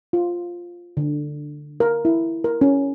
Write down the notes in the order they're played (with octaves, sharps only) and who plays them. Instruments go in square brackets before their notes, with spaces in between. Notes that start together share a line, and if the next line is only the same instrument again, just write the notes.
[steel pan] F4
D3
A#4
E4
A#4
C#4